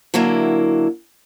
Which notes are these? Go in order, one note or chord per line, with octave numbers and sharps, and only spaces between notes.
D3 F#3 A#3 E4